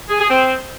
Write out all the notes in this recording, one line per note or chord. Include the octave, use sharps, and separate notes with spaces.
G#4
G#4
C4